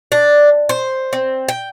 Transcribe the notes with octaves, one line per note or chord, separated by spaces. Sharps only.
D4
C5
C4
G5